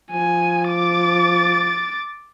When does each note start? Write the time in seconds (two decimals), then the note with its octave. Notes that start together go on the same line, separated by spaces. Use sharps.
0.11 F3 G#5
0.69 D6 A6